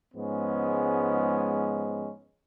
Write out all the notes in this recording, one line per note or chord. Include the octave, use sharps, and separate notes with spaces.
G#2 F3 G#3 B3 C#4